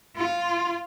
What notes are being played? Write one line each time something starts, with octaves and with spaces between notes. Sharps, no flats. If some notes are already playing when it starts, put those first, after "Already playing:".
F4